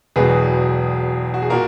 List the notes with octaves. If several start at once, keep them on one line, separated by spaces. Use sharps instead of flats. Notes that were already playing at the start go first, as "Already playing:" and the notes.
E1 E2 B2 F#3 G#4 B4
F#4
G#4
A#2 F#4 A#4